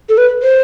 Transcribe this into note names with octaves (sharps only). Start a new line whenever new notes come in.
A4
B4
C5